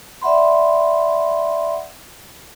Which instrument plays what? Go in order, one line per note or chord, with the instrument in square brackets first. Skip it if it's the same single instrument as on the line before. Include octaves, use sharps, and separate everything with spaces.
[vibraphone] D5 E5 F#5 B5 C6